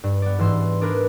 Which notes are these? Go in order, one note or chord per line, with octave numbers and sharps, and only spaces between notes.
G2
B3 D5
G#2 E3 C6 E6
D4 G#4 A#4 B4